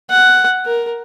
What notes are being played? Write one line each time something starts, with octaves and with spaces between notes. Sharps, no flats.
F#5
A#4